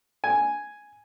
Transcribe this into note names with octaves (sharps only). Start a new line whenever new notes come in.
G#5